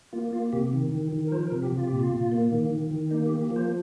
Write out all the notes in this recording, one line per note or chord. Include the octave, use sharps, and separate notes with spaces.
A#3 F4
A#3 F4
C3 G4
D#3
D#3
D#3
A#4
F3 C5
A#4
C3
G4
C3
F4
A#2 G4
F4
A#2
A#3
D#3
D#3
D#3
A#3 D#4
G4
A#3
G4
F3
C5